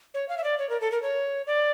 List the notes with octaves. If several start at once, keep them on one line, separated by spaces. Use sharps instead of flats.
C#5
F5
E5
D5
C#5
A#4
A4
A#4
C#5
D5